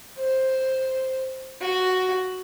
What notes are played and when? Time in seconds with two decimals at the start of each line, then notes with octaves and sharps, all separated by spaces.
0.18 C5
1.61 F#4